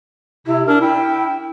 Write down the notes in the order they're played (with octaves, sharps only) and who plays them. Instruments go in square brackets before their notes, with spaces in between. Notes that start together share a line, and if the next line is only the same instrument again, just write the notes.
[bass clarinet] C3 [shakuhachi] E4
[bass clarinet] D4 [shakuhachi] A#4
[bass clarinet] E4 [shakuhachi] G5